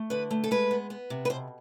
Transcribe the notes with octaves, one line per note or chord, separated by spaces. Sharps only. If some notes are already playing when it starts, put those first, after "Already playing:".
Already playing: A3
D3 B4
A3
A4
G#3 B4
B3
B3
C3
B4
B2 C5